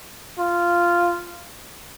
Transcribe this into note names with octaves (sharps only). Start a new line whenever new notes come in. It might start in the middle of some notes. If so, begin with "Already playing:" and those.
F4